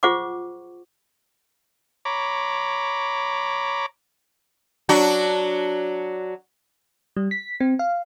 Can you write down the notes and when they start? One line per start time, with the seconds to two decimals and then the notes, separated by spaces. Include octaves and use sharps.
0.03 F4 G#4 C5 F#5 C#6 D6
2.05 C#5 A#5 B5 D6
4.89 F#3 D4 F#4
7.16 G3
7.31 B6
7.60 C4
7.79 F5